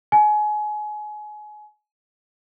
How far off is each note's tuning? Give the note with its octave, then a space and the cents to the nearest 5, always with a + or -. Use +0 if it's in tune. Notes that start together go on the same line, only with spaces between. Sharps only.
G#5 +30